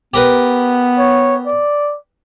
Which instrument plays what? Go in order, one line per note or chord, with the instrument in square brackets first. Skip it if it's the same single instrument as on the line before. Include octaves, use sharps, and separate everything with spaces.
[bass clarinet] B3 [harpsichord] G4 A#4 B4
[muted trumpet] C#5
D5